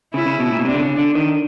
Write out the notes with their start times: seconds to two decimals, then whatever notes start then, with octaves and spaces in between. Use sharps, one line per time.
0.14 C#3 E4
0.27 C#3
0.40 B2
0.52 A#2
0.59 B2
0.65 C3 D4
0.74 D3
0.82 C#3
0.99 D3
1.15 D#3